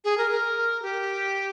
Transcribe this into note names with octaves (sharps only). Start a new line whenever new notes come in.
G#4
A#4
A#4
G4